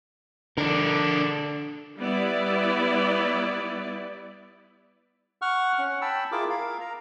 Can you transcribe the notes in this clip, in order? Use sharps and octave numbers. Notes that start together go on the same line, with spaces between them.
D3 D4 A#4
G3 B3 E4 B4 D5
F#5 C#6 F6
C#4 F#5
G5 A5 B5 E6
E4 F4 G#4 A#4 D6
A#4 F5
A#5